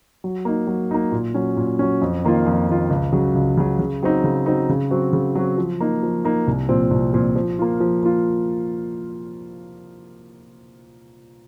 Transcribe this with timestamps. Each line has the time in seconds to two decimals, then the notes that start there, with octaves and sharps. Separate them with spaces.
0.24 F#3
0.45 A#3 D#4
0.67 F#3
0.91 A#3 D#4
1.12 A#2
1.34 F#3 C#4
1.57 A#2
1.79 F#3 C#4
2.01 F2
2.24 D#3 A#3 F4
2.46 F2
2.69 D#3 A#3 F4
2.90 C#2
3.12 C#3 F#3
3.35 C#2
3.57 C#3 F#3
3.79 C#3
4.03 F#3 C4 D#4
4.24 C#3
4.46 F#3 C4 D#4
4.69 C#3
4.90 F#3 C4 F#4
5.13 C#3
5.35 F#3 C4 F#4
5.58 F3
5.80 A#3 D#4
6.03 F3
6.25 A#3 D#4
6.48 C2
6.69 A#2 F3 C4
6.91 C2
7.14 A#2 F3 C4
7.36 F3
7.59 A#3 F4
7.80 F3
8.03 A#3 F4